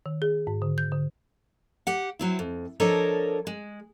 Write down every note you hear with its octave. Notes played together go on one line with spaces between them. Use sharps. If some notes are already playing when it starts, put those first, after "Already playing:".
D#3
G#4
G#2
D3
G6
D3
G4 F#5
F#3 C4 E4
F2
F3 D4 A4 A#4 C#5 D#5
G#3